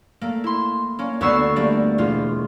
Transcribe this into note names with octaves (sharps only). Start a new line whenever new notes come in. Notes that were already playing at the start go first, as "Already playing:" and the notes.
A3 A#3
E4 C6
A#3 C#4
D2 B3 A4 C#6 E6 C7
G3 A3 A#3 D4
E1 F4